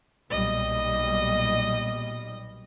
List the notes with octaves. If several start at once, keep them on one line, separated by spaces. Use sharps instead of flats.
B1 A#2 G3 D#5